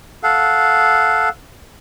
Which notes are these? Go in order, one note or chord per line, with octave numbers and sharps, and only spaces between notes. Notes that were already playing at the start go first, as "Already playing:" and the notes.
A4 F5 F#5